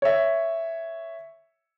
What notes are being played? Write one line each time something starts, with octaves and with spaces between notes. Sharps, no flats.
C#5 E5